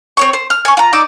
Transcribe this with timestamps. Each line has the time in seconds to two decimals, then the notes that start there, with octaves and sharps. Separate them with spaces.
0.17 C4 C#5 C#6
0.33 C5
0.50 F6
0.65 G#5 C#6
0.77 F4 A#5
0.93 D#4 D5 D6 E6